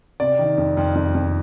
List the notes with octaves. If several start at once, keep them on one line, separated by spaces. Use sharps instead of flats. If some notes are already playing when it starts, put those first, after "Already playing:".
C3 D5
D#3
F2
F2
F2
F2